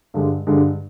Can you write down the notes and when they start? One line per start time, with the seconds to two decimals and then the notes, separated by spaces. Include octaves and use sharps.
0.14 G2 D3 G#3
0.47 G2 D3 G#3